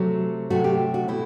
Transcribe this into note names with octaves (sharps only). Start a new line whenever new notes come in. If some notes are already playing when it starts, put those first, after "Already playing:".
Already playing: C3 F#3 A3
C3 F#3 A3 F#4
G4
F#4
B2 A3 E4